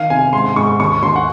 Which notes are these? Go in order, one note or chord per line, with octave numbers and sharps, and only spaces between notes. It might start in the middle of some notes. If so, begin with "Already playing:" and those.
Already playing: D#3 F5
C3 G#5
G#2 C6
G#2 C#6
D#2 C#6
D#2 C6
F#5